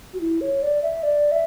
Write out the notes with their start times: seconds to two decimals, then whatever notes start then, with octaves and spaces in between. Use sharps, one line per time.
0.14 F#4
0.21 E4
0.41 C#5
0.62 D5
0.82 E5
1.03 D5
1.31 E5